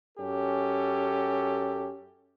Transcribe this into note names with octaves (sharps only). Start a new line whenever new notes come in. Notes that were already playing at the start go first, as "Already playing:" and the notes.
F#2 C#4 G4 A4